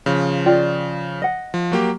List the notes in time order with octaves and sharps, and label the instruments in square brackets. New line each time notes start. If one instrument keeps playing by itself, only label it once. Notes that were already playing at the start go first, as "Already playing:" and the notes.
[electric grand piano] C#3 F3
[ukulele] F4 D5 G5
D#5 F#5
[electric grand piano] F3
F#3 A#3 G4